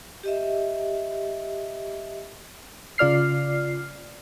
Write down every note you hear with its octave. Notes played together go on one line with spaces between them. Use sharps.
G4 D#5 E5
C#3 F4 D5 F6 C7